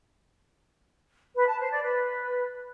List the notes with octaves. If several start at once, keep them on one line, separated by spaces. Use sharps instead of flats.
B4
A5
C5
D5
B4